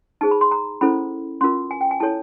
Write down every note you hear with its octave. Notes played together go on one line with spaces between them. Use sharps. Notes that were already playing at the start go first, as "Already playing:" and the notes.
D#4 G#4 C5 A5
B5
C6
A#5
C#4 E4 A4 C5 B5
C#4 F4 A#4 C6
G#5
G5
G#5
E4 A4 C#5 A5